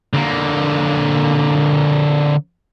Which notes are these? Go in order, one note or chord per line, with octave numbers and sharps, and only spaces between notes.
D3 A#3